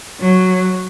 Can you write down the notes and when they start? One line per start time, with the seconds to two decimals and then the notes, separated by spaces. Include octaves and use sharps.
0.20 F#3